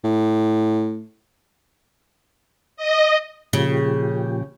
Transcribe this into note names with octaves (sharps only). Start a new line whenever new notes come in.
A2
D#5
A#2 C#3 F3 G4